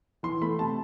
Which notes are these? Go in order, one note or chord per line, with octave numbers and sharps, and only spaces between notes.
E3 C6
A3 B5
C3 A5